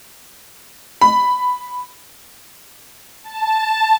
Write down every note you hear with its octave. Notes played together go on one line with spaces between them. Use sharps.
B5
A5